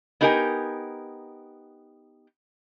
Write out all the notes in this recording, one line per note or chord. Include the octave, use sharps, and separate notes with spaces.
B3 D#4 G4 A#4 F#5 G#5